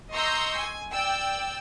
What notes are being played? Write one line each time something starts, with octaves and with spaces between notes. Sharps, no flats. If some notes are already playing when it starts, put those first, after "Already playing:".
D#5 A#5 C6 C#6 E6 G6
G#5
D5 G5 E6